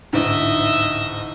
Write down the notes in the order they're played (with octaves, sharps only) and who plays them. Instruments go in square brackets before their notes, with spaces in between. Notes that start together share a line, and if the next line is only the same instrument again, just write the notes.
[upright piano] A1 D2 G#2 [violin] D#5 E5